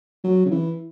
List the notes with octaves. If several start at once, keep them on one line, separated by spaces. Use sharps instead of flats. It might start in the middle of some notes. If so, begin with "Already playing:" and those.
F#3
C#3
E3